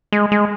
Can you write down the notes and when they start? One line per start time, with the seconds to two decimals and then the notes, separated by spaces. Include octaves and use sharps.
0.12 G#3
0.32 G#3